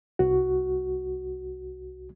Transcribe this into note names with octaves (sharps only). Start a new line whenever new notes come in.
C2 F#4